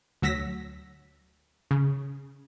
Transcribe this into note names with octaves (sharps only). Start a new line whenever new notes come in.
D2 F#3 E6 A#6 B6
C#3